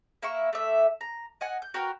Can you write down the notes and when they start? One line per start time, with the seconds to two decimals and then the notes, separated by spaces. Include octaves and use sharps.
0.23 A#3 E4 E5 C#6
0.53 A3 D4 E5
1.01 A#5
1.41 D#5 F#5 G#5
1.62 G6
1.74 F#4 A#4 B4 G5